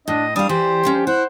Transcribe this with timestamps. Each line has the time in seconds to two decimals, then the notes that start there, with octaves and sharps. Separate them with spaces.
0.08 A2 D4 D#5
0.36 G3 D4 F5 D#6
0.49 E3 G4 C5 D5 E5
0.84 D3 F3 C#4
1.07 E4 C5 F#5